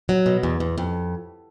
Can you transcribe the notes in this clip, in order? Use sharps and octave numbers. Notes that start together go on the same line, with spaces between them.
F#3
B2
E2
E2
F2